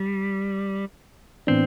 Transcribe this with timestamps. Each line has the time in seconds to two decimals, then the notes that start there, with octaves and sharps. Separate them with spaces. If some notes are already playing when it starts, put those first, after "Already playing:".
Already playing: G3
1.47 A2 E3 B3 C4 D4